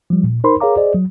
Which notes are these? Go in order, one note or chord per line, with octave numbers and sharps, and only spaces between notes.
F3 G3
A#2
D#4 A#4 C5 B5 C6
G#4 A#4 C#5 F5 A#5 D6
G#4 C5 D5 D#5
F#3